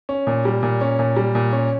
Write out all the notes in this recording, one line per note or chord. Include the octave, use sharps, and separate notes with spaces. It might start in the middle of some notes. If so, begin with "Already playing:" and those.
C#4
A#2
G3
A#2
C#4
A#2
G3
A#2
C#4